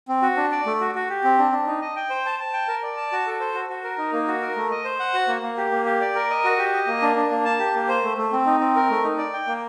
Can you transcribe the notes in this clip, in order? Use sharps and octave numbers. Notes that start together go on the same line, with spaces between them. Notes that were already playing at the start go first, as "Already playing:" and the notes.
C4
F#4
D4
D5
A3
F#4
F#4
G4
C4
D4
D4
D#4
D#5
G5
C5
A5
A5
G5
A#4
D5
A5
F#4
A4
C5
F#4
F#4
A#4
D#4
A#3
F#4
A#4
A3
D#5
C5
F#5
F#4
A#3
A#3
G4
A#3
G4
D5
A#4
D#5
F#4
G4
D#5
A#3
D4
D4
A#3
A5
G4
A#3
C5
A3
A3
C4
D#4
C4
A#4
A3
D#4
D5
G5
A#3